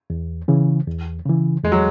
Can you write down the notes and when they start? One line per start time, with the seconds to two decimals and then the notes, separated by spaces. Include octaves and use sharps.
0.10 E2
0.48 C#3 E3
0.87 E2
1.25 C#3 E3
1.64 E2 G#3
1.72 F#3